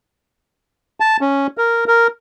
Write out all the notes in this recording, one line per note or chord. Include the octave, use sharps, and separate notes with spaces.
A5
C#4
A#4
A#4